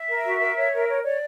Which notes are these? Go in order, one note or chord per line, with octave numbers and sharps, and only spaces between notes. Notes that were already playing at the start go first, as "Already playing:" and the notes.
Already playing: E5
A#4
F#4
A#4
C#5
A#4
C#5
C#5 D5